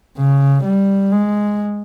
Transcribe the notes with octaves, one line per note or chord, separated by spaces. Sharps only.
C#3
G3
G#3